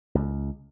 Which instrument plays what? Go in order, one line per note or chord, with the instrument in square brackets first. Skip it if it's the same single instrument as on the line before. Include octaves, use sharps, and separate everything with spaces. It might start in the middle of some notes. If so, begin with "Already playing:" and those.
[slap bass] C#2